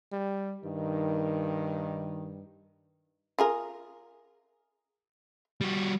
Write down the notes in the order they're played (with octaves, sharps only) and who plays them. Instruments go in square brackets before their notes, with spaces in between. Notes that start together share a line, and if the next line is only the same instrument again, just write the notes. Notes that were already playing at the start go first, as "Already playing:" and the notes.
[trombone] G3
[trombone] G2 [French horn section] D#3
[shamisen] F4 G#4 A#4
[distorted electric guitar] G3 F#4